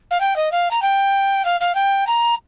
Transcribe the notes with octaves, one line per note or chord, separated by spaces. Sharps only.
F5
G5
D#5
F5
A#5
G5
F5
F5
G5
A#5